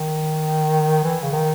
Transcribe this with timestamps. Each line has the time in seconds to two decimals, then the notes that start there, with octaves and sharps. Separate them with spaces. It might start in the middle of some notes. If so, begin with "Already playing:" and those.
Already playing: D#3
1.04 E3
1.22 C#3
1.33 D#3